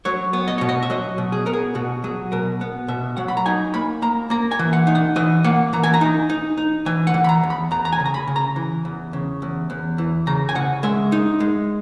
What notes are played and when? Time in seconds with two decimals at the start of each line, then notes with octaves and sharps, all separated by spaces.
0.05 F#3 C#5
0.33 B3
0.48 D#5
0.58 B2 C#5
0.69 D#5
0.83 E5
0.90 F#3 D#5
1.18 B2
1.32 G#4
1.46 B3 A#4
1.53 G#4
1.75 B2 F#4
2.04 F#3 G#4
2.32 B2 A#4
2.61 B3
2.88 B2 E5
3.17 F#3 F#5
3.28 B5
3.37 A#5
3.46 D#4 G#5
3.74 A#3 B5
4.02 A#3 A#5
4.30 A#3 A#5
4.51 G#5
4.59 E3
4.73 F#5
4.87 D#4
4.95 F#5
5.16 E3 D#5
5.44 A#3 F#5
5.73 E3 A#5
5.83 G#5
5.94 A#5
6.01 D#4
6.30 D#4
6.57 D#4
6.86 E3 G#5
7.07 F#5
7.14 E3
7.24 B5
7.29 A#5
7.44 E2
7.50 B5
7.71 E2 A#5
7.85 A#5
7.92 G#5
8.00 C#3
8.06 A#5
8.14 B5
8.28 C#3
8.36 A#5
8.56 E3
8.85 E2
9.13 C#3
9.42 E2
9.70 E2
9.98 E3
10.27 C#3 A#5
10.49 G#5
10.55 C#3 F#5
10.83 G#3 E5
11.12 D#4
11.40 G#3